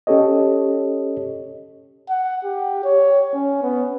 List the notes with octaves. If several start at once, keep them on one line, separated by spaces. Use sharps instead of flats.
C#4 G4 A4 C#5 D#5
F#5
G4
C#5
C#4
B3